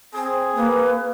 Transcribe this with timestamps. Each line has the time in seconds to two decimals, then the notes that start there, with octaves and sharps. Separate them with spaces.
0.14 C4 G#4
0.55 A#3 B4